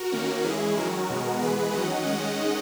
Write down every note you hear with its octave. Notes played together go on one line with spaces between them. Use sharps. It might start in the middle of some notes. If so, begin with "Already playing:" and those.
Already playing: F#4 A#4
D#3 A#3 C#4
E3 G#3 C#4 E4 G#4
D#3 F#3 C#4 F#4 A#4
B2 G#3 B3
E3 G#3 B3 G#4 B4
D#3 F#3 C#4 D#5 F#5
D#3 G#3 C#4 D#5 F#5